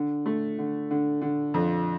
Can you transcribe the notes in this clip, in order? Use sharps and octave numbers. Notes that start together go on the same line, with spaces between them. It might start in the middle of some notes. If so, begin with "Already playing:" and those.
Already playing: D3
A3
D3
D3
D3
F2